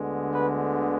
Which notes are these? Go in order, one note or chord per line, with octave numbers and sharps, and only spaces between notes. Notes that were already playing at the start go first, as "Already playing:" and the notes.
Already playing: D2 D3 G#3 B3
B4